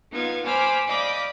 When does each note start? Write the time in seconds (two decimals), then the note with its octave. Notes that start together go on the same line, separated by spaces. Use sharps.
0.12 B3 D#4 F4 F5 G#6
0.45 C5 G#5 B5 D6 F6
0.88 D5 D#5 F5 B5 D6 G6